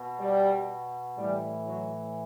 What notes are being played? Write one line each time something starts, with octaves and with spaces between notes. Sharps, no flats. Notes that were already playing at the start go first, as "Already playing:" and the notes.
Already playing: B2
G3
A2 E3 G3
F#3